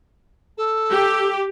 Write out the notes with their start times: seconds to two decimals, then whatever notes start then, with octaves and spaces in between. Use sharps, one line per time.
0.57 A4
0.90 G4